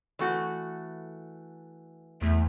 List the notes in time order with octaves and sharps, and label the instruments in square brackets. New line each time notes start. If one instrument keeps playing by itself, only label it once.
[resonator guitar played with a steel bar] E3 A3 F#4
[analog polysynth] E2 [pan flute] A3